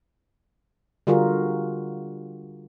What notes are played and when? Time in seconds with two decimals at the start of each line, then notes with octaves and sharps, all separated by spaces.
1.07 D3 G3 F4 F#4 G#4 A#4